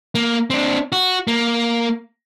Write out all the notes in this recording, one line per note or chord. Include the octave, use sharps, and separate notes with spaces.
A#3
C4 D4
F#4
A#3